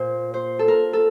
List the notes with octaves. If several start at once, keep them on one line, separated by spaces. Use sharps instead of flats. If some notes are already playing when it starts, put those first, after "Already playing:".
Already playing: A#2 C5
C5
A4
A#4
A4